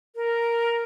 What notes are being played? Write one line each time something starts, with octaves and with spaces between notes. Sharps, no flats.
A#4